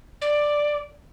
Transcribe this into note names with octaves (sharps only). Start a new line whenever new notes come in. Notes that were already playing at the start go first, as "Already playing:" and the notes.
D5